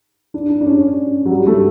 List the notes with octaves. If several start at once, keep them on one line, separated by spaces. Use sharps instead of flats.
D4
D4
D4
C#4
F#3
G3
A3